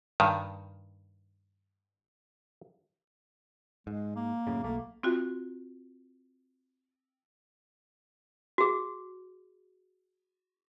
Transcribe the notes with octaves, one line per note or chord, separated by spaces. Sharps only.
G2 D#3
G#2 G#3
A#3
F#2 A2 C#3
B1 A3 A#3
C4 F4 F#4
F#4 G#4